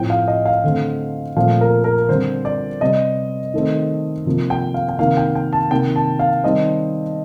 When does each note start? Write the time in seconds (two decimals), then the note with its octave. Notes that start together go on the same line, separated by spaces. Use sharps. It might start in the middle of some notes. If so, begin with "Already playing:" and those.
Already playing: A2 F3 C4 G5
0.10 F5
0.28 D#5
0.46 F5
0.64 D3 A3 C4
1.37 A#2 F3 A3 C4 F5
1.61 A#4
1.84 A#4
2.09 D3 G3 C4 C5
2.45 D5
2.81 C3 G3 C4 D#5
3.54 D#3 A3 C4
4.26 C3 F3 A#3
4.50 G5
4.74 F5
4.88 G5
4.99 C3 D#3 A#3 F5
5.17 G5
5.35 G5
5.53 A5
5.71 C3 D#3 A#3 G5
5.96 A5
6.19 F5
6.44 D#3 G3 C4 D#5